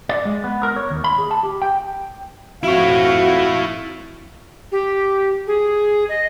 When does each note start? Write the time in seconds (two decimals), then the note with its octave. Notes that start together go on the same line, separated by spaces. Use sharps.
0.09 D5
0.25 G#3
0.44 B3
0.63 A#4
0.76 C#5
0.90 D#2
1.04 B5
1.18 G#4
1.31 A5
1.43 G4
1.62 G5
2.63 F2 E4 F#4 C#5 F5
4.71 G4
5.47 G#4
6.09 D#5